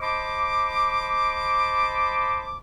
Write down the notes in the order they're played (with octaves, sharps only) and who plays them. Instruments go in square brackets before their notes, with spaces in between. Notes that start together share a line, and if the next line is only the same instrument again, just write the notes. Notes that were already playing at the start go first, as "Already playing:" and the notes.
[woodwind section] C5 D#5 A5 B5 D6